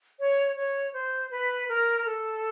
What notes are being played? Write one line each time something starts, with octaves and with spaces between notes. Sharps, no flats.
C#5
C#5
C5
B4
A#4
A4